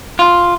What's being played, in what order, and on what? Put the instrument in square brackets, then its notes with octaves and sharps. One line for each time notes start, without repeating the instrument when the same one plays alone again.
[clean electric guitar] F4